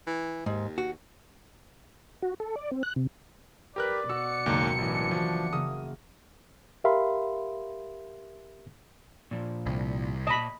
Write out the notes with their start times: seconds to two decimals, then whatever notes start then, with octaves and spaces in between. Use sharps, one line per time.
0.07 E3
0.46 D#2 G#2
0.78 F#4
2.22 F#4
2.40 A4
2.56 D5
2.71 C4
2.83 F#6
2.96 C3
3.76 G4 A#4 B4 D5 F#6
4.10 B2 F#4 E6 C#7
4.46 F#1 D#2 G#2 A#5
4.78 A1 E3 D4
5.11 E3 F3 F#4
5.53 C#3 A#3 D#6
6.84 G4 A#4 E5 F5 B5 C6
9.31 A#2 F3
9.66 C2
10.27 A#2 D#5 A5 B5